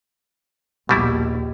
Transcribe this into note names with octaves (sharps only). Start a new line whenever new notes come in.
A#1 D#2 B2 G3 E4